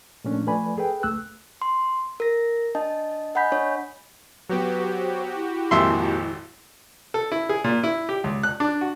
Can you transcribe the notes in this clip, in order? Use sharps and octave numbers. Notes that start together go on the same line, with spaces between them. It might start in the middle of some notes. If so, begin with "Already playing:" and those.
A#2 F3 A3 C#4 D4
F3 A3 B4 D5 G#5 B5
G#4 A4 B4 G5
C#2 A3 E6 F#6
C6
A#4 A#6
D4 D#5 A5
D#5 F#5 G#5 B5 G6 B6
D4 C#5
F#3 B3 F#4 G4 B4
C5
E4
G#1 F2 A#2 E5 C6
A4
E4
G#4
A#2
E4
G4
C#2
F#6
D4
F#4